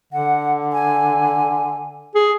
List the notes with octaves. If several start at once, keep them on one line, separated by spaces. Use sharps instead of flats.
D3 F#5
G#5
G#4